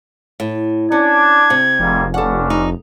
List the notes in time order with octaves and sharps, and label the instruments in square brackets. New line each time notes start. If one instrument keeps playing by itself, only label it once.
[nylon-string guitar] A2
[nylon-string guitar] C#4 [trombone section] D4 [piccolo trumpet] G#6
[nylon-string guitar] C3
[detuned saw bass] F1 [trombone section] G#2 G3 A#3
[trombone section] G2 C#4 D4 [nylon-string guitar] A4 F#5
[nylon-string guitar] D#4